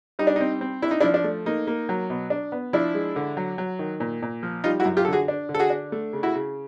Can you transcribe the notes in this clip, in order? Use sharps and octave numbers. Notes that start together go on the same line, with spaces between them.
G3 D#4
D4
C4 D#4
C4
D4 E4
D#4
D4 E4
F3
D4
A3
A#3 D#4
A#3
F#3
B2
D4
B3
F3 D4 E4
G#3
D3
F#3
F#3
D#3
A#2
A#2
F3
G3 D#4 F4
E4 F#4
F#2
F4 G4
D3 A4
F#4 G#4
D4
D3
A4
F#4 G#4
D4
A3
C#3
E4 F#4
C#3